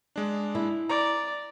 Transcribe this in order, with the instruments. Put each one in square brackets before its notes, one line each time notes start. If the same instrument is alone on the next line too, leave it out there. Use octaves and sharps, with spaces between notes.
[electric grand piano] G#3 D4
[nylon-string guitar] E4
[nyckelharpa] D5 [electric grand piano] A#5